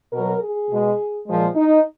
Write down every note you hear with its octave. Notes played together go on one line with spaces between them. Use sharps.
B2 F#3 A#4
G#4
B2 G#3
A#2 F3 G#3
D#4